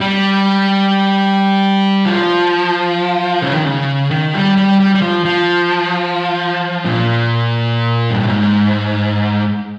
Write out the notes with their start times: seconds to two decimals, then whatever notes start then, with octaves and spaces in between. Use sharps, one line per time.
0.01 G3
2.06 F3
3.42 C#3
3.55 D#3
3.66 C#3
4.11 D#3
4.33 G3
4.57 G3
4.80 G3
4.95 G3
5.02 F3
5.25 F3
6.85 A#2
8.10 G2
8.22 G#2